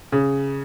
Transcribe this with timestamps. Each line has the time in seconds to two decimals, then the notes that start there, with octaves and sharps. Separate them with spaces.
0.12 C#3